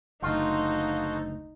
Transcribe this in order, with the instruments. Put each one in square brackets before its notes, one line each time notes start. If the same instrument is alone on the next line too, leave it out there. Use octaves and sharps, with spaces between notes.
[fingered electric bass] F#1 D2 [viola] D#4 [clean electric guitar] F4 [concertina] F#4 A4 C5